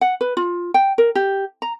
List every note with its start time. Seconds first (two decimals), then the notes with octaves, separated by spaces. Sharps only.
0.01 F#5
0.21 B4
0.37 F4
0.74 G5
0.98 A#4
1.15 G4
1.62 A#5